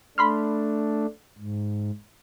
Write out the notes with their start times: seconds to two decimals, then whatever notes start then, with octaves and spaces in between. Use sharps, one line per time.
0.18 A3 D4 B5 C6 F6
1.38 G#2